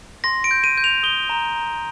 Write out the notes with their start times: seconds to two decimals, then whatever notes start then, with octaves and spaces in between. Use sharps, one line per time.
0.24 C6 A#6
0.44 D7
0.51 G6
0.64 D#7
0.78 G6
0.84 F7
1.03 D#6 G7
1.30 A#5
1.56 A#5